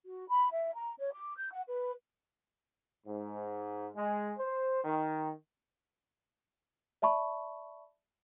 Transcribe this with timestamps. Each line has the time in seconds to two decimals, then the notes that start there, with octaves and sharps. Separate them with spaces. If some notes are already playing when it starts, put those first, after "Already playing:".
0.06 F#4
0.28 B5
0.52 E5
0.76 A#5
0.98 C#5
1.13 D6
1.37 G6
1.51 F#5
1.68 B4
3.06 G#2
3.95 G#3
4.38 C5
4.84 D#3
7.02 D5 E5 A5 B5 C#6